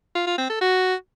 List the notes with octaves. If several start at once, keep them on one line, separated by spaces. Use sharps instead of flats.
F4
F4
C4
A4
F#4